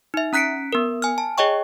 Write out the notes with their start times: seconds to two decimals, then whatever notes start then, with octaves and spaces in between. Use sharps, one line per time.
0.14 D#4 E5
0.33 C#4 A#5 F#6 B6 C#7 D7
0.73 B3 A#4
1.02 G#5 F6
1.18 A5
1.38 G#4 C#5 D#5 G5 C#6